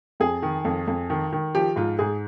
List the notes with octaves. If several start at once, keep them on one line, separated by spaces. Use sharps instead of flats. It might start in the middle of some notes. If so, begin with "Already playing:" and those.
F2 G#4
D#3
F2
F2
D#3
D#3
F3 G4
G#2 F4
G#2 G#4